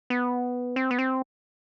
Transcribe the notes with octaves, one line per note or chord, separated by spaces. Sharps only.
B3
C4
B3
C4